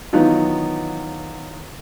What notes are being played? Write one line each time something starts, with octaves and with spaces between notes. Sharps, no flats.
D#3 E3 F#3 B3 D#4 F4